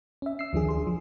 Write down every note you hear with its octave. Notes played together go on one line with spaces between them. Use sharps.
C#4 E5
E6 C7
D2 D#3 F3 D4 G#4
G#4 C6
F3